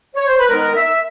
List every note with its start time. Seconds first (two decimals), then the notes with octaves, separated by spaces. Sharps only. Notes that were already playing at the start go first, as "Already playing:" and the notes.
0.16 C#5
0.28 C5
0.39 B4
0.50 D#3 G#3 B3 D#4 A#4
0.76 E5